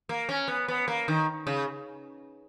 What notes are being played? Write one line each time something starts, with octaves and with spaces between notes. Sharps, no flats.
A#3
C#4
B3
B3
A#3
D#3
C#3